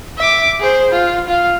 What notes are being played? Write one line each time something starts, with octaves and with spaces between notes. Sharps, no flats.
E5 D6
G#4 C5
F4
F4 F5